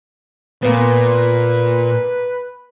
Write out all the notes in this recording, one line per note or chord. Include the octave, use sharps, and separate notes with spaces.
A#2 A#3 B3 B4